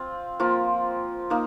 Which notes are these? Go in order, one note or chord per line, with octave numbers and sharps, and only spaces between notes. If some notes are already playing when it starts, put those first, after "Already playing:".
Already playing: C4 F4
F3 A#3 F4
A#3 D#4